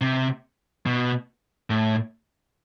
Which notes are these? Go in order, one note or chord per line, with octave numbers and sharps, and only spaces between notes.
C3
B2
A2